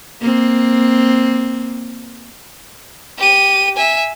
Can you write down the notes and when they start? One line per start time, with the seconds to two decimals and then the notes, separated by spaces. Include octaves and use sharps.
0.21 A#3 C4
3.18 G4 D#7
3.76 E5 G#5